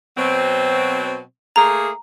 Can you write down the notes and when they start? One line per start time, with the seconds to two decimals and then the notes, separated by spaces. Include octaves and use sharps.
0.17 B2 F#3 C4
1.56 A3 A#3 G#4 A#5